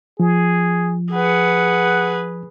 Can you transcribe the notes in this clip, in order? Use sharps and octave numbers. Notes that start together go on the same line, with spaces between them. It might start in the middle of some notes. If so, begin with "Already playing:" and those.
F3 G#4
G#4 B4 F#5